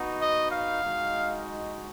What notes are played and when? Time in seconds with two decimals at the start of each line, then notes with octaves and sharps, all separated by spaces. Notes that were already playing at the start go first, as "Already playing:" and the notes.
Already playing: B3 D#4 F#4
0.21 D#5
0.52 F5
0.81 G#3 D#4 F#4